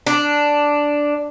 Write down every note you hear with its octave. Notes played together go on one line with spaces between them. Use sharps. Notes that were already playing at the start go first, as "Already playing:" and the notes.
D4